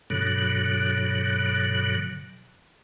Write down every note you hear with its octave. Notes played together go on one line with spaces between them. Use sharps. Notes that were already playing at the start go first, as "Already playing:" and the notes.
G2 B2 D3 F#3